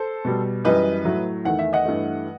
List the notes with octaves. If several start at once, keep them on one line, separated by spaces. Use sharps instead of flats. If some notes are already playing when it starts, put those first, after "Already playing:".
Already playing: A4 C5
B2 G3
F#2 E3 G3 B4 D#5
A2 F#3 A3
E2 D#3 A3 F#5
E5
D#5 F#5
G2 E3 A3